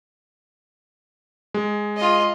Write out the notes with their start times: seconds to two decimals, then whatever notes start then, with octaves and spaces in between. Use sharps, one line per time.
1.54 G#3
1.96 F4 D#5